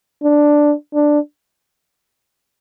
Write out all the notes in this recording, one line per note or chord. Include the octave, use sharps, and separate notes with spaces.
D4
D4